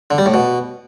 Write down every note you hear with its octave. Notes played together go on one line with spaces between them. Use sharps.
D3
G3
A2
B2